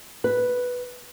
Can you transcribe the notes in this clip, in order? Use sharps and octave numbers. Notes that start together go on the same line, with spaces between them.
B4